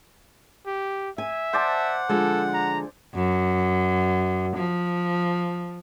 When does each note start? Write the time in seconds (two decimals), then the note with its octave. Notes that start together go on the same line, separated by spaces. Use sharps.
0.66 G4
1.18 E5 G#5
1.53 C5 D5 F#5 A5
2.09 D3 F3 G#3 A4
2.54 A#5
3.14 F#2
4.56 F3